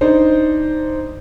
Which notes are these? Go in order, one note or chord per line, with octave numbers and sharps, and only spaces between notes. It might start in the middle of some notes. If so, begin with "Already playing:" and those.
D4 D#4 C5